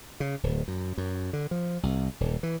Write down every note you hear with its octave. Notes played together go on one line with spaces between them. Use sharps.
C#3
D1
F#2
F#2
D3
F3
C2
D#1
E3